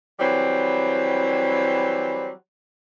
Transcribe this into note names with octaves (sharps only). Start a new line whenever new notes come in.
E3 F#3 G3 C4